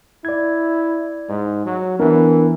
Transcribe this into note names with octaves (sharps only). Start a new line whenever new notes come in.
E4 D5 G#6
G#2
F#3
E3 B3 D4 A#4